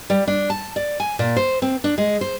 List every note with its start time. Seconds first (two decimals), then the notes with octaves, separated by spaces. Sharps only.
0.10 G3
0.27 D4
0.50 A5
0.76 D5
1.00 G#5
1.19 A#2
1.37 C5
1.62 C4
1.84 D4
1.98 G#3
2.21 C5